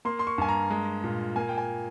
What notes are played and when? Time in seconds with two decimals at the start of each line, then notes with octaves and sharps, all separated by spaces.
0.05 A#3 C6
0.19 C6
0.27 C#6
0.38 G2 G#5
0.49 A#5
0.70 G#3
1.04 A#2
1.36 A#3 G#5
1.49 G5
1.58 G#5